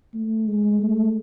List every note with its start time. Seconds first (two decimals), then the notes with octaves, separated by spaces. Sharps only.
0.14 A3
0.48 G#3
0.83 A3